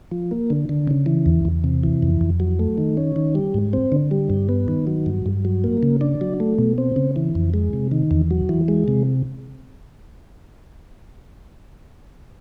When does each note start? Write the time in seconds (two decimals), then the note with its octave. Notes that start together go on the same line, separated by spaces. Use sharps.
0.11 F3
0.31 A#3
0.50 D3
0.69 D3
0.87 C#3
1.06 E3
1.26 E2
1.45 E2
1.64 C3
1.83 E3
2.03 F2
2.21 F2
2.40 F#3
2.59 A3
2.78 D#3
2.97 C#4
3.16 D#3
3.35 G3
3.54 G#2
3.73 C4
3.92 D3
4.11 G3
4.30 G2
4.49 B3
4.68 D#3
4.87 F#3
5.06 G2
5.26 G2
5.45 F#3
5.64 A#3
5.83 C#3
6.01 D4
6.21 F#3
6.40 A3
6.58 B2
6.78 C4
6.96 C#3
7.16 E3
7.35 F2
7.54 G#3
7.73 C3
7.91 D#3
8.11 E2
8.31 F#3
8.49 E3
8.68 G#3
8.88 C3